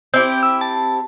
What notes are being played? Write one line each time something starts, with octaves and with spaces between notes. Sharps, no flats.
C4 E4 G4 G6
E6
A5